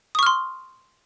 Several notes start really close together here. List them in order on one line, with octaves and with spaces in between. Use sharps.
D#6 C#6 F6 C6